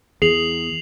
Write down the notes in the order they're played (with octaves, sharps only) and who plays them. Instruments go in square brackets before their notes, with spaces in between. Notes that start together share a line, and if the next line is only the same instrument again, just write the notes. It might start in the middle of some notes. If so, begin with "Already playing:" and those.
[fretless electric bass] E2 [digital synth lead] G#4 [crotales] C7 F7 F#7